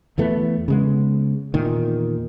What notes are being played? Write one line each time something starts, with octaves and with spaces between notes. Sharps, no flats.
E2 E3 A3 B3
C#3 G#3 B3
E2 A#2 D#3